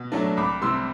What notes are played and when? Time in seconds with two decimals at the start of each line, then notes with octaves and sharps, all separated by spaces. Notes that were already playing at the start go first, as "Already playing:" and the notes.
Already playing: B2
0.12 F#3 A3 D4
0.37 C2 B5 D6
0.61 C3 G3 C6 E6